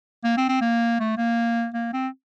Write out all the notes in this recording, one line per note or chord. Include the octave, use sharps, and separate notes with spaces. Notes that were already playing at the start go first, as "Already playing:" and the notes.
A#3
C4
C4
A#3
A3
A#3
A#3
C4